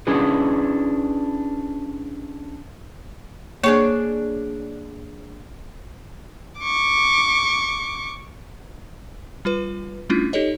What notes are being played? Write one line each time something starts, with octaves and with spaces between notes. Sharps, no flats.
C#4 D4 E4 G#4 B4
A#3 D4 G#4 C#5 C#6
C#6 D6
G3 F4 B4
G3 A3 C#4 D4 E4 F4
D#4 G4 A4 C#5 D#5